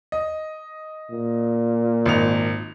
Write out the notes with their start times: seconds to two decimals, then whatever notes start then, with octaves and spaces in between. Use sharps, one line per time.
0.12 D#5
1.11 A#2
2.06 G#1 D#4 F7